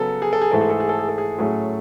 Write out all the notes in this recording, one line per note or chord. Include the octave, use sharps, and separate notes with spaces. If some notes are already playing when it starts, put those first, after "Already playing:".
Already playing: C#3 F#3 B3 A4
G#4
A4
G#4
G#2 E3 A3 A4
G#4
A4
G#4
A4
G#4
A4
G#4
A2 F#3 A3 C#4 G#4